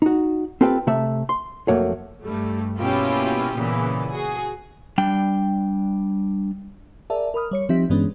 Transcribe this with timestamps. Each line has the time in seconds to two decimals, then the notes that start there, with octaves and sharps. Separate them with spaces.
0.02 D#4 F#4
0.61 C4 F4 G4 A4 B4 G5
0.87 C3 A3 E5
1.29 C6
1.68 B1 F2 A3 A#3 F#4 C#5
2.23 G2 G3 A3
2.79 B2 A#3 C#4 E4 F4 G4
3.56 A#2 C#3 E3 B3
4.12 F#4 G#4
4.98 G3 D4 G5
7.10 G#4 A#4 D5 E5 A5
7.34 A#4 B5 D#6 F6
7.51 G3 C#5 C#7
7.69 F3 C4 D#4 G4 E5 B6
7.90 G2 E3 G#3 B3 C#4 D4